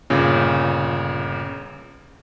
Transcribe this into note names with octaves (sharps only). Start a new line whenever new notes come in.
G1 A#2 C#3